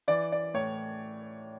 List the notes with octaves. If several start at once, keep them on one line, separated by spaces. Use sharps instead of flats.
E3 D5
D5
A2 C#5